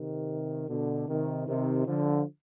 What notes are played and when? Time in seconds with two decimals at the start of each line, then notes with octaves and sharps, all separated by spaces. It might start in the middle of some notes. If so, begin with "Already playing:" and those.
Already playing: C3 D#3
0.69 B2 D3
1.08 C3 D#3
1.48 C3 D#3
1.87 D3 F3